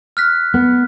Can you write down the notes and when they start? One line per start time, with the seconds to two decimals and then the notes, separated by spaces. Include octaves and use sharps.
0.17 F6 F#6 B6
0.54 B3